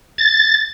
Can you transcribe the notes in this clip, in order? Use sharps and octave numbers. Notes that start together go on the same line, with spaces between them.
A6